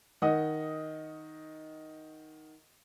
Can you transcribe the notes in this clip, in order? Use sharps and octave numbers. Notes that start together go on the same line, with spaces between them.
D#3 D#5 F#5 D#6